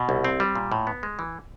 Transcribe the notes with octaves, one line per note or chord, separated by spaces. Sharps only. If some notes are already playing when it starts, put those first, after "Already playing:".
Already playing: B2
C2
C4
G3
A#2
A2
B3
G#3
E3